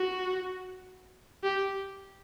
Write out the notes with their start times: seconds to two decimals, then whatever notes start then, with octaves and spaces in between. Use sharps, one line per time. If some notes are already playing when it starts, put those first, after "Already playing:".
Already playing: F#4
1.43 G4